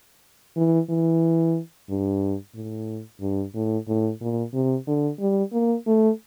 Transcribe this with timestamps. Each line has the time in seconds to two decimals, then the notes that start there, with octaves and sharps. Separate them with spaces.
0.57 E3
0.89 E3
1.89 G2
2.55 A2
3.21 G2
3.55 A2
3.88 A2
4.21 A#2
4.54 C3
4.87 D3
5.20 G3
5.52 A#3
5.87 A3